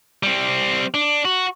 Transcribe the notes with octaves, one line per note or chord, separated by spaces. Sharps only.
G3 C4
D4
F#4